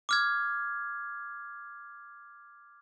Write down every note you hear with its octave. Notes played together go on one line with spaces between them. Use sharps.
D6 F6 G#6